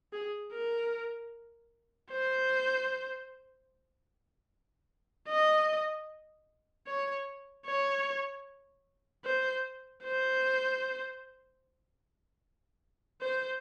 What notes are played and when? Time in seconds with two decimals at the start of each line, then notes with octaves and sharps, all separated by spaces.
0.13 G#4
0.53 A#4
2.11 C5
5.28 D#5
6.87 C#5
7.66 C#5
9.25 C5
10.04 C5
13.21 C5